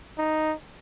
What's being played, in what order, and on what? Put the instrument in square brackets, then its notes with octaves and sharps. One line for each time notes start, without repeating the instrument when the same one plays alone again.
[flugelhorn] D#4